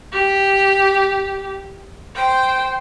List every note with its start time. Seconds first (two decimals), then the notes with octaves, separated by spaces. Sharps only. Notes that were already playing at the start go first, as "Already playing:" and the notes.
0.12 G4
2.15 C5 G5